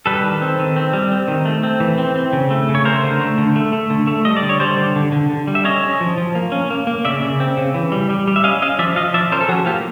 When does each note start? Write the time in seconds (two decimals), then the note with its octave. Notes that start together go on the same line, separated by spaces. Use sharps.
0.06 G3 A4 B4
0.23 D#3
0.42 C4
0.59 D#3
0.76 C4
0.93 G3
1.12 C4
1.28 D#3
1.45 A3
1.63 C4
1.80 E3
1.98 C4
2.16 C4
2.33 C#3
2.50 A3
2.69 C#3
2.75 C#5
2.85 A3 A#4 C5
3.03 D3
3.21 A3
3.38 D3
3.56 A3
3.73 A3
3.90 D3
4.07 A3
4.25 G3 D#5
4.37 D5
4.42 D3
4.49 C#5
4.60 G3 C5 D5
4.77 D3
4.96 D3
5.12 D3
5.30 D3
5.47 G3
5.55 E5
5.65 C#4 C#5 D#5
5.83 C#4
6.01 F3
6.17 F3
6.35 A#3
6.52 C#4
6.70 A#3
6.87 A#3
7.05 C#3 D5 E5
7.22 C#3
7.40 C4
7.57 C#3
7.74 E3
7.92 G3
8.10 G3
8.27 G3
8.36 E5
8.44 C#4 D#5 F5
8.62 C#4 D#5 F5
8.79 F3 D5 E5
8.96 F3 D#5 F5
9.14 F3 D5 E5
9.32 C#4 A#4 C5
9.41 A4
9.48 F3 F#4 G#4
9.66 A#3 F4 G4